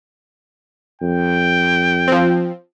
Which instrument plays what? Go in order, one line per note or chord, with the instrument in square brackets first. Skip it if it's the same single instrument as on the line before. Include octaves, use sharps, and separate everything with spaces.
[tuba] F2 [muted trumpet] G5
[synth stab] F3 C4